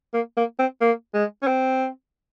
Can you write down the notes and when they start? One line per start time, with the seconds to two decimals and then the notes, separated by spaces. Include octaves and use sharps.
0.14 A#3
0.37 A#3
0.59 C4
0.81 A#3
1.14 G#3
1.42 C#4
1.47 C4